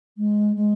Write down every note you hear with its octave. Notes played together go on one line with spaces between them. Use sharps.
G#3
G#3